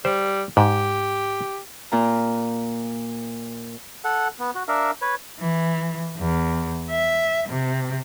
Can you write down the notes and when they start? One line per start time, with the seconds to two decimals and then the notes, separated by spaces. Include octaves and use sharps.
0.05 G3 C5
0.57 G#2 G4
1.92 A#2 F4 A#5
4.04 A4 F#5
4.39 B3
4.55 F#4
4.68 D4 A#4 E5 F5
5.01 B4 C#5
5.41 E3
6.17 E2
6.90 E5
7.49 C3